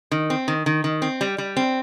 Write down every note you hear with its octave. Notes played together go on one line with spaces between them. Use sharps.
D#3
C4
D#3
D#3
D#3
C4
G3
G3
C4